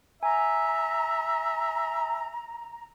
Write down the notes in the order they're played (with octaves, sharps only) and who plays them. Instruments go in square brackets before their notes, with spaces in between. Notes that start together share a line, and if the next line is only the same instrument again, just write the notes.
[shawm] E5 [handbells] G#5 [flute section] A#5